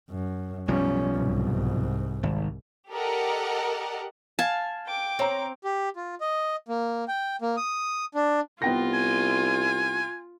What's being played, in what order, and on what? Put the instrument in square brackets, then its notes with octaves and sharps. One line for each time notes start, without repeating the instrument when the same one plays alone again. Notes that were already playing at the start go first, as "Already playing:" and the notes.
[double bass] F#2
[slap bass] B1 F3 G3 [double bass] C#4
[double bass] C2 G#2
[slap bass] G#1
[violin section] G4 A4 A#4 D5 D#5 F#5
[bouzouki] F5 G#5 [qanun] A5
[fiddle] G5 D6
[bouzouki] C4 [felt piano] C#5 A#5
[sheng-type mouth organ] G4
F4
D#5
A#3
G5
A#3
D#6
D4
[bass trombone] C2 [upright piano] B3 G5 A#6 [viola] F4
[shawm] G#5